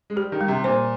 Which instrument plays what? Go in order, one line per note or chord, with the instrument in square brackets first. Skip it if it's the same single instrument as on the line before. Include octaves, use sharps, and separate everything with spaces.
[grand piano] G#3
[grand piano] G3 [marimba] G4
[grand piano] D#3
[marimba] G3
[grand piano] C3
[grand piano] A#2 [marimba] C5